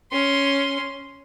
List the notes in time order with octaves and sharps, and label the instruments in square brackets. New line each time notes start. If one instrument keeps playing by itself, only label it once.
[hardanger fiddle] C#4 C6